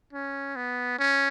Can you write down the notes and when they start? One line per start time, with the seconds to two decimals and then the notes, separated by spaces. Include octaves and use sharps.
0.13 C#4
0.56 B3
0.99 C#4